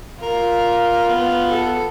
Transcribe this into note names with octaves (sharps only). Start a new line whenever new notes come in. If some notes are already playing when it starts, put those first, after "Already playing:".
F4 A#4
B3
A4